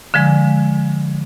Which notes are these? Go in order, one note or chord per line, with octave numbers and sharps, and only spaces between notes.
D3 F3 G#3